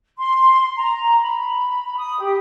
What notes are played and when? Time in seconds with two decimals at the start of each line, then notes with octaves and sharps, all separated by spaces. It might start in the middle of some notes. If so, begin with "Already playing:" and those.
0.17 C6
0.77 A#5
1.21 B5
1.97 D#6
2.19 G4